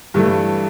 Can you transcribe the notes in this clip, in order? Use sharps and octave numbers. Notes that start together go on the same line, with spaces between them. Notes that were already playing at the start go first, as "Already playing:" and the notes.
G2 E3 A3